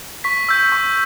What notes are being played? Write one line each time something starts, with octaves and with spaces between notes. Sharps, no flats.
C#6 B6
E6 G6
C#6